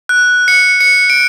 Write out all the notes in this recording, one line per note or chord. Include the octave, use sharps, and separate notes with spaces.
F#6
C#7
C#7
D7